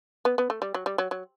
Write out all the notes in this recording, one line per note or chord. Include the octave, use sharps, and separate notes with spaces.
B3
B3
A3
G3
F#3
G3
F#3
F#3